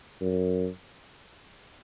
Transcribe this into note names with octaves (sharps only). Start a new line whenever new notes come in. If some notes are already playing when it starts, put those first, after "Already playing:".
F#2